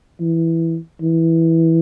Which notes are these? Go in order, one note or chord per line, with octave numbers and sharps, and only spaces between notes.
E3
E3